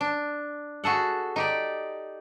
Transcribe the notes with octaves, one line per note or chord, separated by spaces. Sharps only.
D4
F#4 G#4 A4 F#5
D#4 G4 D5